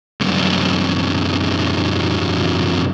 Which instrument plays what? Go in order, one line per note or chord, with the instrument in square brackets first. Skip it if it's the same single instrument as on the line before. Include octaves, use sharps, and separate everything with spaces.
[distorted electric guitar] C2 F#2